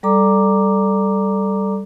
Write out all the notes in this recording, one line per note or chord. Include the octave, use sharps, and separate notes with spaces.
G3 A4 D5 A#5 D6